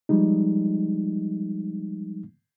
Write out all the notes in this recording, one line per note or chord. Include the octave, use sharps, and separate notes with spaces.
F3 G3 G#3 D#4